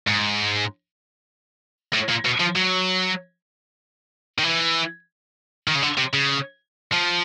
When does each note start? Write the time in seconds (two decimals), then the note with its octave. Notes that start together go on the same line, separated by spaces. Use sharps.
0.07 G#2
1.94 A2
2.09 A#2
2.25 B2
2.40 F3
2.56 F#3
4.38 D#3
4.43 E3
5.68 D#3
5.75 C#3
5.83 D3
5.98 C3
6.14 C#3
6.92 F3